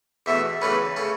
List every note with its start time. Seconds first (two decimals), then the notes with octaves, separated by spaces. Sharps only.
0.26 E2 B2 A3 E5
0.62 E2 C#3 A3 C#4 B4
0.97 C#3 A3 C#4